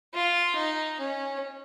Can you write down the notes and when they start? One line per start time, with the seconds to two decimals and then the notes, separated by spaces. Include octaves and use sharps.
0.14 F4
0.56 D#4
1.00 C#4